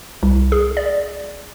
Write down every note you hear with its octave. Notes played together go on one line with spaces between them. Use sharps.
C2
G#4
D5